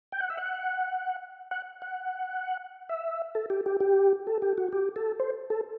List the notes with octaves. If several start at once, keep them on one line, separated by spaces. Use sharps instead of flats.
G5
F#5
E5
F#5
F#5
F#5
E5
A4
G4
G4
G4
A4
G4
F#4
G4
A4
C5
A4